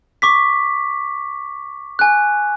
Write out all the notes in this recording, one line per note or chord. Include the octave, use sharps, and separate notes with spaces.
C#6 D6 B6
G#5 F#6